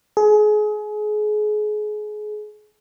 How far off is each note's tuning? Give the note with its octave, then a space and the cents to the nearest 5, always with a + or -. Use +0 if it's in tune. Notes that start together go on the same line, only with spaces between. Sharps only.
G#4 +30